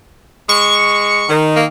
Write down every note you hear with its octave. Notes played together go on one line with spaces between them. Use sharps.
G#3 C#6
D#3
A#3